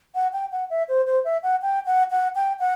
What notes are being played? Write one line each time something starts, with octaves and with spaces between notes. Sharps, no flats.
F#5
G5
F#5
E5
C5
C5
E5
F#5
G5
F#5
F#5
G5
F#5